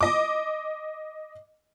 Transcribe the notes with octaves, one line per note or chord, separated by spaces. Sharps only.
D#5 D6